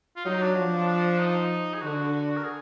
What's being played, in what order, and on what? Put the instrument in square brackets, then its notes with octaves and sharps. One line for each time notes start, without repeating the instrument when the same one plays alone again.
[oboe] F4
[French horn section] F#3 [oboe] D#4
[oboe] D4
[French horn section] F3
[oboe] D#4
G#4
[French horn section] D3 [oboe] F#4
[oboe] A#4
G#4